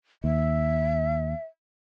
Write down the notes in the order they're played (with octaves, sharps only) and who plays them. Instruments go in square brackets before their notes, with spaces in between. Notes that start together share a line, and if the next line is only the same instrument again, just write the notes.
[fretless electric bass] D#2 [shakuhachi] E5